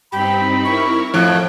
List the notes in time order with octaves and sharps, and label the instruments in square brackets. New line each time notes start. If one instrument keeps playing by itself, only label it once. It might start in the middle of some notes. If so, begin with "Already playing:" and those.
[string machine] G2 C4 D#4 [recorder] G4 [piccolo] B5
[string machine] E4 A#4 [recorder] C#6
[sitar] F2 A2 [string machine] G5 [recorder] F#6